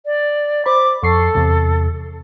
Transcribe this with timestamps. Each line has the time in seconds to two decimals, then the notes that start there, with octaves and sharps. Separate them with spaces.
0.06 D5
0.66 C5 B5 D6
1.03 F2 A4 C#6 C7
1.35 E2 C3